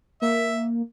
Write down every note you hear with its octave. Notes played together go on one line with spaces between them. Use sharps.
A#3 E5